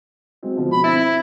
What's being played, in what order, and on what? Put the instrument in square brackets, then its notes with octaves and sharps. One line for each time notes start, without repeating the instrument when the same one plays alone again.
[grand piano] F#3 G#3 C4
B2 D3 F3
[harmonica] B5
[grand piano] C4 A6 [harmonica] E4